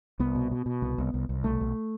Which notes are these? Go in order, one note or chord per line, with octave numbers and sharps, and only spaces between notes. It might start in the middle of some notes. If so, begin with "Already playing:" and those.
C2 B3
B2
B2
B2
C2 B3
C2
C2
C2
B1 A3
B1